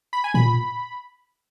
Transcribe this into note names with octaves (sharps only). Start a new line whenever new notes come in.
B5
G#5
A#2 B5